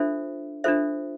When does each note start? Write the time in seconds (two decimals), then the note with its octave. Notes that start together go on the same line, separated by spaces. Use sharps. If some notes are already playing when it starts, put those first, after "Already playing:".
Already playing: D4 F4 A4 C5 E5
0.64 D4 F4 A4 C5 E5